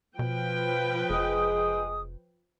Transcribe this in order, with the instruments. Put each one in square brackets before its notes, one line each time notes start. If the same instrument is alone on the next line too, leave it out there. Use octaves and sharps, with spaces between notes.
[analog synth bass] B2 [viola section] F3 B4 G5
[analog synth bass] F1 [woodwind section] G#3 G#4 D#6